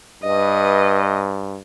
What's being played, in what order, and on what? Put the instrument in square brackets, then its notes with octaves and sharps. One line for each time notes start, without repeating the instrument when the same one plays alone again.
[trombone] G2 [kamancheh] B4 D#5